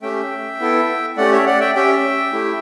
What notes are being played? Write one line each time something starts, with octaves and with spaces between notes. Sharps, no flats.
A3 C#4 G4 E5 G5
B3 E4 A4
A3 C#4 G4 D5 F#5
C#5 E5
D5 F#5
E5 G5
C#4 G4 E5 G5
A3 E4 G4